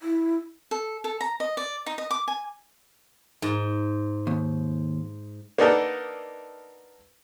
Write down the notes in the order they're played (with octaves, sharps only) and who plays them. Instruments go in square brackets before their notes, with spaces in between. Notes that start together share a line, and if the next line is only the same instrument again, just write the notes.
[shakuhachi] E4
[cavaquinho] A4
A4
A#5
D#5
D5
D#4
D#5
D6
G#5
[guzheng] G#2
[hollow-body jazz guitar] D#2
[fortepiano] A#3 B3 D4 D#4 A4 A#4